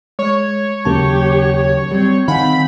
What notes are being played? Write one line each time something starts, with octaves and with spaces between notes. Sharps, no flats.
G#3 C#5
D#2 C#3 F#3 A#3 G4 A5
G3 C4
D#3 C4 F5 F#5 G#5 B5